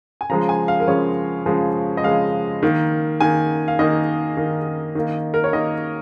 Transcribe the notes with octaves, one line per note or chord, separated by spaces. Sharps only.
G#5
C#3 F3 G#3 A#5
G#5
F5
A#4
C#3 F3 G#3 C#5
C#3 F3 G#3
D#5
C#3 F3 G#3 F5
D#3 A#3
D#3 A#3 G#5
F5
D#3 A#3 D#5
D#3 A#3
D#3 A#3
A#4
C#5
D#3 A#3 D#5